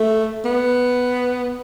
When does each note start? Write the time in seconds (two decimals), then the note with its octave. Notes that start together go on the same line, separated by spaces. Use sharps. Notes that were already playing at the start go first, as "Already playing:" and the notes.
Already playing: A3
0.45 B3